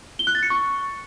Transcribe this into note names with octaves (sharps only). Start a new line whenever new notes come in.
G7
F#6
A6
C#7
C#6